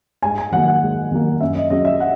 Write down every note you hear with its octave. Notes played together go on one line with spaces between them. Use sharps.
G#2 G#5
G#5
D#3 F#3 A#3 F#5
F#5
G#2
D#3 F#3 A#3
F#2 E5
D#5
C#3 F#3 D#5
E5
F#5